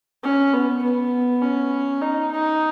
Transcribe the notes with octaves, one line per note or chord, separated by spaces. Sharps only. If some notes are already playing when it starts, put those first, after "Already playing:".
C#4
B3
B3
C#4
D#4
D#4